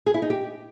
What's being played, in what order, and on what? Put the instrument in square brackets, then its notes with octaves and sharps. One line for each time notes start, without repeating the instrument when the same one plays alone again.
[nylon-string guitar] G#4
E4
D#4
G4